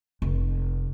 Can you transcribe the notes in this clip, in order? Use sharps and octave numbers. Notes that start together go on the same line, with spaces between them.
F1